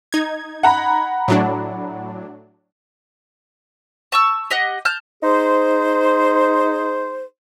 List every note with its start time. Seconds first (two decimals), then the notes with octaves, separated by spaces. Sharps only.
0.13 D#4 G#6
0.63 F#5 A#5 B5
1.28 A2 F#3 D4
4.12 A5 C#6 E6
4.50 G4 D#5 F#5
4.85 A5 F6 G6
5.24 D#4 G#4 C5